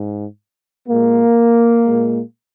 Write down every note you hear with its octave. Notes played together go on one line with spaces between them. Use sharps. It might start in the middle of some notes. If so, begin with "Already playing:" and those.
Already playing: G#2
A#2 G#3 A#3
A#2 G#3